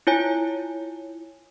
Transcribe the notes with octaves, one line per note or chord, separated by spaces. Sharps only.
E4 F4 C#5 G#5